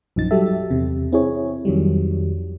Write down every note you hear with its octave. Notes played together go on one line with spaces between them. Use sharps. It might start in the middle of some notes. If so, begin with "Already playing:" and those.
A#1 F#2 F3 D#4 A6
F#3 G3 G4 A4 E5
E2 C3
C4 E4 G#4 C#5
F2 D#3 F#3 G3